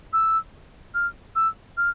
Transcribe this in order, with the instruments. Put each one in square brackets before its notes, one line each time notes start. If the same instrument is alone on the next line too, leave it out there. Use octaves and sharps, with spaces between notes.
[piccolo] E6
F6
E6
F6